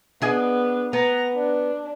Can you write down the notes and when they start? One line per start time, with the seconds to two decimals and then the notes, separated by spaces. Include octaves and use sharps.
0.22 B3 D4 G#4 D#5
0.93 B3 A#5
1.34 D4